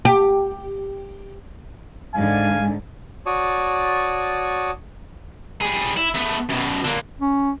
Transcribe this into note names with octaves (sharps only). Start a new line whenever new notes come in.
G4
G#2 D3 F5 G#5
F#4 C#5 D5 A5 C#6 D#6
G3 G#4
E4
A3 B3
F#2 B2
D3 A#3
C#4